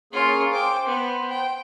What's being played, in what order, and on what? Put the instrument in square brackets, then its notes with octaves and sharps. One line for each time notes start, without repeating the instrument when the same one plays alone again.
[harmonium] A#3 C#4 G#4 [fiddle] F4 C#5
[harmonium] C5 [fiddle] G5 D6
[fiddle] B3
G5